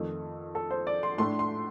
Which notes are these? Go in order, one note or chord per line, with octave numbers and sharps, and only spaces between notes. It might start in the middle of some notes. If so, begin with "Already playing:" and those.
Already playing: F2 D#3 A3
A4
C5
D5
C6
A2 A3 D4 C6
C6